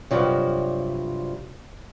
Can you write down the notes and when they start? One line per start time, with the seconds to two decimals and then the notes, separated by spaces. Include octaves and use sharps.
0.11 G2 C3 F3 F#3